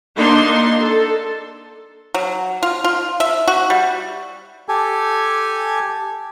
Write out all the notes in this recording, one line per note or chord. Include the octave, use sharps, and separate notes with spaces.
A#3 D4 D#4 C6
A4
F#3
F4
F4
E5
F#4
G3
G4 A4 G#5